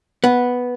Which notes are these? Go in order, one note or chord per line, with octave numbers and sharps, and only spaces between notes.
B3